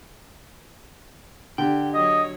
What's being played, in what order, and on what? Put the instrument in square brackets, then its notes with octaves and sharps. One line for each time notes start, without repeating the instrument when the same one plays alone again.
[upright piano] D3 [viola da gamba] G4 [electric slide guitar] G5
[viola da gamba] F#3 C#5 [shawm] D#5